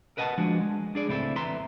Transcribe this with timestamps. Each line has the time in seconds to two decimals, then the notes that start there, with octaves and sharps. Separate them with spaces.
0.17 A#4 B4 D#5 F#5 G5 A5
0.38 F3 G#3 D4 F#4
0.60 G#3
0.95 D4 G#4 D5
1.07 C#2 A2 C4 E4 A4
1.36 E2 B4 E5 A#5 C6